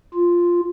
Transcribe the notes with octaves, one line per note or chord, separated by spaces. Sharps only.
F4